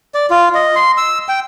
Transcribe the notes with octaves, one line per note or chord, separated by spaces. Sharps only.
D5
F4
D#5
C6
E6
G5